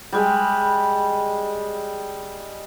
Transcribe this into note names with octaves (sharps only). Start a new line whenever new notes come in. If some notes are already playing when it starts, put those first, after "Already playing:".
G3 G#3